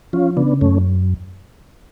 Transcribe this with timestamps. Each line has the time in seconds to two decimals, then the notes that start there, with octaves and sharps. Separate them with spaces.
0.13 F3 C#4 F4
0.37 C#3 B3 D4
0.61 F#2 A3 C#4